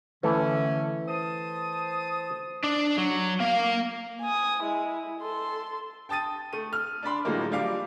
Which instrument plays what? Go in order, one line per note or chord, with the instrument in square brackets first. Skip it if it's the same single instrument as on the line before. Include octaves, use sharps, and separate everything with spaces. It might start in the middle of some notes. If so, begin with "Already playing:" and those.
[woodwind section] D3 C#4 [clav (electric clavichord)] E3 A3
[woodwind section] C5 A5 D#6
[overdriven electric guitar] D4
F#3
A#3 F5
[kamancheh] G#5 D#6
G#3 E4
A4 C6
[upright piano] G5 A5 D#6 A6 D#7
A3 D#7
F6
D4 D5 B5 C6
A2 D3 F3 F#3 G#3 A#3
F3 G3 F5 D6